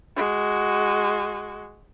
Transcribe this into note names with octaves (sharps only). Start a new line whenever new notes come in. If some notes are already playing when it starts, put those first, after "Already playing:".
G#3 F#4